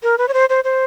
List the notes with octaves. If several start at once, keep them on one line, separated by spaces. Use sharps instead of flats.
A#4
B4
C#5
C5
C5
C5